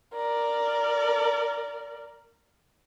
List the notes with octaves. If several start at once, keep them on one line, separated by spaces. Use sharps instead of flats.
A#4 D5